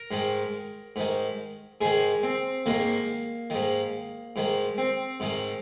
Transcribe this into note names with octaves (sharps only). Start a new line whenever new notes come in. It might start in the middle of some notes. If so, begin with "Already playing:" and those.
Already playing: A#4
G#2 D#3
G#2 D#3
G#2 D#3 G#4
C4
G#2 D#3 A#3
G#2 D#3
G#2 D#3
C4
G#2 D#3